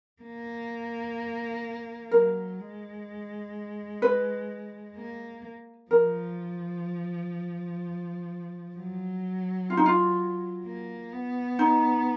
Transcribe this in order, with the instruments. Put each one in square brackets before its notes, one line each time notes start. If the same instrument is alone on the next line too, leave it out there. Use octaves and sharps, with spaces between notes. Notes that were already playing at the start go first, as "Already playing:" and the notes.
[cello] A#3
[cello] F#3 [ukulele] A#4
[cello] G#3
[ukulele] B4
[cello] A#3
[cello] F3 [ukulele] A#4
[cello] F#3
[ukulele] F4
D#4
F4
[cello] A#3
B3
[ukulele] D#4